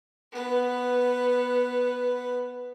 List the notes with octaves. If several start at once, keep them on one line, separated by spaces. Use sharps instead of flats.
B3 B4